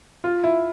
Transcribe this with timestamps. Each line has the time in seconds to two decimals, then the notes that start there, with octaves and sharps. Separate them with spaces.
0.24 F4
0.44 E4